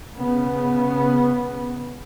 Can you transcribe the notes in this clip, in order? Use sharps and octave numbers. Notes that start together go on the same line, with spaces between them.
C#3 B3